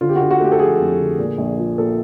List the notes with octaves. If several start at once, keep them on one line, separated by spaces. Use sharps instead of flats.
D3 F4
G4
D3 F#4
F#4
A3 G4
A4
F3 G#4
F2
D3
A#2
A#1
F3
A#2 A4